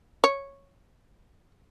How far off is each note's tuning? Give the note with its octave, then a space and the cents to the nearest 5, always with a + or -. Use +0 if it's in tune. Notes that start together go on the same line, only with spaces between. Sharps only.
C#5 -5